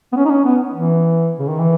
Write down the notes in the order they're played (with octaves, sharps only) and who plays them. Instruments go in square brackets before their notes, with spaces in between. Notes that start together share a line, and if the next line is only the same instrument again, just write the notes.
[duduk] B3
C#4
D#4
C#4
B3
E3
C#3
D#3
E3